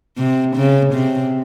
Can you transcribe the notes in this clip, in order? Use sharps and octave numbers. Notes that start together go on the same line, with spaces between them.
C3
C#3
C3